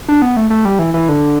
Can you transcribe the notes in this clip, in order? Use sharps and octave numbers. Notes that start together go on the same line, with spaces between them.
D4
B3
A3
A3
G3
E3
E3
D3